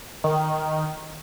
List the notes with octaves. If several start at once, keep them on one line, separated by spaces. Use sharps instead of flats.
D#3